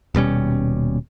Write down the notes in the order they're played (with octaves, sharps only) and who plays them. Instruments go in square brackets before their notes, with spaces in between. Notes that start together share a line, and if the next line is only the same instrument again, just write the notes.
[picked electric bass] D#1 B2 G3 C#4